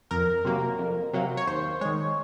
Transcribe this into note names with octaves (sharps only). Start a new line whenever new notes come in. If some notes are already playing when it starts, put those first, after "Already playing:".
F2 A#4
C3 F#3 A#3
F2
C3 F#3 A#3
C#5
D#2 C5
D#3 G#3 C#5